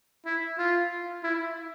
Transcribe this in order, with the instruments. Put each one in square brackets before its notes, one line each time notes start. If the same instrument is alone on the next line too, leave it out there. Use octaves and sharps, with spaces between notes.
[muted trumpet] E4
F4
E4